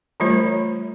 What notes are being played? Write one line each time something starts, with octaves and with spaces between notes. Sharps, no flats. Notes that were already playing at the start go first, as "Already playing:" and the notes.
E3 G3 A3 F4 C5 C#5